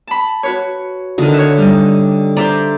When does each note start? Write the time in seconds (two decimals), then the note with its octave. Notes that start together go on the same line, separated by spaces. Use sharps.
0.07 A5 B5
0.43 F#4 B4 C#5
1.18 D3 D#3 D#4 F#4
1.34 C#5 E5
1.58 G3 D#4
2.37 C5 D5 E5 A#5